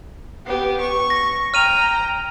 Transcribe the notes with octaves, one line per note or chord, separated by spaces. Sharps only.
B3 G4
C#6
A#6
G5 A#5 F6 D#7 F7